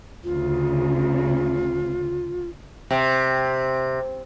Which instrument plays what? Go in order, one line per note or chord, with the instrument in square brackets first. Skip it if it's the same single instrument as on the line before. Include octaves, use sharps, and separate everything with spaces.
[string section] D2 C#3 [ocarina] F4
[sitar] C3